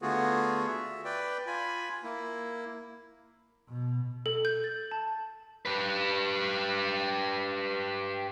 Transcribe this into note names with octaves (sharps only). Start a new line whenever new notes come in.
D3 A3 B3 F4 F#4 G#4
E5
B4 D5 G5
F4 G#5 B5
A#3 E4
B2
A4
G6
A6
A5
G4 B4